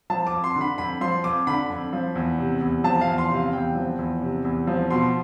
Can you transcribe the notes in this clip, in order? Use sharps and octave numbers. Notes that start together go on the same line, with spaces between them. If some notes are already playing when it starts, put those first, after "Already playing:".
F3 A5
D6
F2
C6
D3
B5
F2 B5
F3 C6
F2 D6
D3 B5
F2
F3
E2
C3
E2
F3 A5
F5
E2
C6
C3
F5
E2 G5
F3
E2
C3
E2
F3
B2 C6